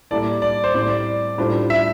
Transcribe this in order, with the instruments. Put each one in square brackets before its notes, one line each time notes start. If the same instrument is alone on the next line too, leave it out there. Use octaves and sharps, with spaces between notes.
[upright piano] A2 G3 A#3 E4 A4 [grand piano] D5
[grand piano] D5
C5
[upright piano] A2 G3 C4 [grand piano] D5
[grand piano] D5
[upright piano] A2 G3 D4 F4 C5
[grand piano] E5